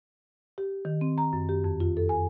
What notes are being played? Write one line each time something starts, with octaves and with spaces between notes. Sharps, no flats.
G4
D#3
C4
A#5
F#2
G4
F2
F4
A4
G#5